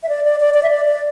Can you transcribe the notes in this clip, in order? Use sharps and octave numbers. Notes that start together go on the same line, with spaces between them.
E5
D5
D5
D5
D5
E5
D5
D5